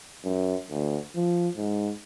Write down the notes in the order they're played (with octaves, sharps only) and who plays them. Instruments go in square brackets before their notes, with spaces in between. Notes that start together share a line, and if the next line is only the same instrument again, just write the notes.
[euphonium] F#2
D2
F3
G#2